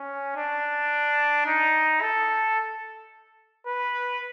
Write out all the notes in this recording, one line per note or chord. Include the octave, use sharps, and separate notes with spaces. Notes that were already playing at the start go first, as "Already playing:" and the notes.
Already playing: C#4
D4
D#4
A4
B4